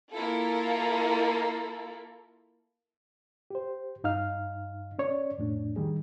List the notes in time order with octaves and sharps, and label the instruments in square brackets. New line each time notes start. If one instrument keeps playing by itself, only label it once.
[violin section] A#3 E4 F4 A4
[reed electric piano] G4 C5
G2 D#4 F5 F6
C#4 C#5 D5
F2 A2 D4
D#3 G3 G#4